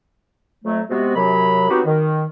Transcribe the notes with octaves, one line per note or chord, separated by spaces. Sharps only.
F2 F#3 A3
C3 G#3 B3 F#4
F#2 C3 F#3 B5
F#3 B3 C4 D#4 F#4 G4
D#3